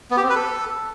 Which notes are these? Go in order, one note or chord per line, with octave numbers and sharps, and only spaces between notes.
B3
G4
C4
B4
A4